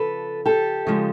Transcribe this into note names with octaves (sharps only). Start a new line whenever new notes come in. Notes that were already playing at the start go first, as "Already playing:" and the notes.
Already playing: C#3 F3 A4 B4
G4 A4
C#3 F3 G#3